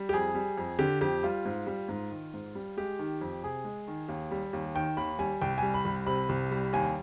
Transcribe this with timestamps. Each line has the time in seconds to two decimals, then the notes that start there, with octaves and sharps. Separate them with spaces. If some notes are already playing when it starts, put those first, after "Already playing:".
Already playing: G3
0.09 G4
0.13 F2 G#4
0.35 G3
0.58 F2
0.79 D3 G4
1.01 F2 G4
1.23 G3 F4
1.45 G#2
1.67 G3
1.89 G#2
2.11 D#3
2.34 G#2
2.55 G3
2.77 G#3 G4
2.99 D#3
3.21 F2
3.43 C3 G#4
3.65 G#3
3.88 D#3
4.09 D#2
4.31 G3
4.53 D#2
4.75 D#3 G5
4.97 D#2 B5
5.19 G3 G#5
5.42 C2 G5
5.58 G3 G#5
5.74 B5
5.85 C2
6.06 C3 B5
6.29 C2
6.51 G3
6.73 D#2 G#5